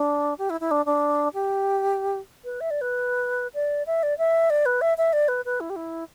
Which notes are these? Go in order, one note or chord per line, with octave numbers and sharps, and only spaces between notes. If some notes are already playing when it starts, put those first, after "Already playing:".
Already playing: D4
G4
E4
E4
D4
D4
G4
B4
E5
D5
B4
D5
E5
D5
E5
D5
B4
E5
E5
D5
B4
B4
E4
G4
E4